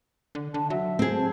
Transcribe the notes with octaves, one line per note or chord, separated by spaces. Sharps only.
D3
D3 A5
F#3 E5
C4 G#4
A5